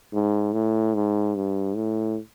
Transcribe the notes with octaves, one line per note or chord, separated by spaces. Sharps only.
G#2
A2
G#2
G2
A2